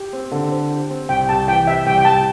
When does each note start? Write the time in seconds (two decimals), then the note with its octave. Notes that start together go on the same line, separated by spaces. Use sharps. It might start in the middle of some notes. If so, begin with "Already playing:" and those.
Already playing: G4
0.13 C4
0.32 D3
0.51 C5
0.70 G4
0.90 C4
1.09 C2 G5
1.29 C2 A5
1.48 E3 G5
1.67 C3 E5
1.86 C2 G5
1.98 G5
2.05 C2 A5